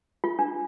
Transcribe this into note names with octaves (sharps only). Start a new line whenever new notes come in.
F4
D4